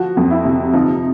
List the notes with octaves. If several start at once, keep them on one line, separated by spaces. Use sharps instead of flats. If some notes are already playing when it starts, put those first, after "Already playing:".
Already playing: F3 F#4
F2
E4
C3
F3 D#4